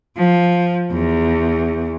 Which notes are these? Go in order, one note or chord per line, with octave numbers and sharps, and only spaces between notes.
F3
E2